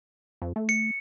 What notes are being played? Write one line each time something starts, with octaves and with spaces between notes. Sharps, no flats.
F2
A3
C#7